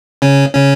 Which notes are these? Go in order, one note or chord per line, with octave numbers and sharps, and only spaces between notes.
C#3 C#4
C#3 C#4